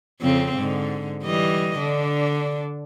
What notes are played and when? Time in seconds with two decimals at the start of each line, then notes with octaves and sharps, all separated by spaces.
0.20 F2 C#3 C4
0.57 G#2 D3
1.24 E3 G3 D#5
1.79 D3 D4